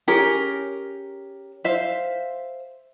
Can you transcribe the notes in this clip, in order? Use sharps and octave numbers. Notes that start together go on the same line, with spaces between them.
C#4 G4 G#4 A#4
C5 E5 F5